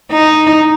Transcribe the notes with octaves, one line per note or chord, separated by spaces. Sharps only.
D#4